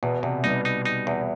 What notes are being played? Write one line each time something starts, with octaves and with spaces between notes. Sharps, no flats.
E2 B2
E2 C3
G3 B3 D#4
D#4
D#4
E2